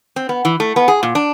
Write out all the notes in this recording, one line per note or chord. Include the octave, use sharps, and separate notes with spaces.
C4
B3
E3
A3
B3
G#4
A#2
D4